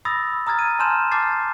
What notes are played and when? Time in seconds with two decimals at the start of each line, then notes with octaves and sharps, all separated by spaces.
0.05 B5 D#6 E6 A6 A#6
0.47 A#5 D#6 F6 G#6 A6
0.59 D#7
0.79 G#5 A5 C6 F6 G6 E7
1.11 A5 D6 F6 G6 A6 C7